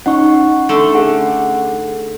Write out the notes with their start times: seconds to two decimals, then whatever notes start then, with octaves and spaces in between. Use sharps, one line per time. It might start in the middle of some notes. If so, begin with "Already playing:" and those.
0.06 C#4 D#4 F#5 C#6
0.69 D3 A3
0.95 G#4 F#5